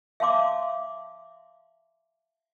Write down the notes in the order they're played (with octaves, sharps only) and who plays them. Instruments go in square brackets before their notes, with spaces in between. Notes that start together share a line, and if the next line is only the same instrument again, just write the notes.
[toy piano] E5 F5 A5 C6 D6